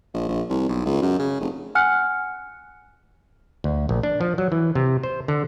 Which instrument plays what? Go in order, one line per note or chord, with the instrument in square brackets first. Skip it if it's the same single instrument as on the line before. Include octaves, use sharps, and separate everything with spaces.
[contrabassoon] A#1
A#1
C2
B1
C#2
F#2
C#3
F1
[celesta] F#5 G#5 F6 F#6 C#7
[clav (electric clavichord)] D2
A#1
D4
F3
F#3
E3
C3
C5
D3